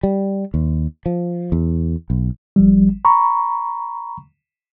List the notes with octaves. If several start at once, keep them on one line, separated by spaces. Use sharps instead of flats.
G3
D#2
F3
E2
B1
G#1 F3 G3
A#5 B5 C#6